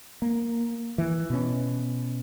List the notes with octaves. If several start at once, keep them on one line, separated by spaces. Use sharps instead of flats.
A#3
E3
B2 C#4